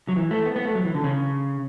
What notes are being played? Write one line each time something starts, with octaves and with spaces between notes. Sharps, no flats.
F#3
E3
A3
B3
B3
A3
F#3
E3
D3
C#3